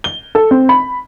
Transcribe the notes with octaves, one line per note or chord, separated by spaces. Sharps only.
G7
A4
C4
B5